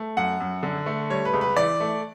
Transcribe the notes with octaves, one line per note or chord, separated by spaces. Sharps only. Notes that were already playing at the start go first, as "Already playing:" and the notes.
Already playing: A3
F#2 F#5
F#2
D3
A3
G3 C#5
B4
C#2
B4
E3 D5
A3